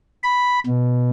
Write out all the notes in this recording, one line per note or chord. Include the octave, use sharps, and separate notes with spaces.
B5
B2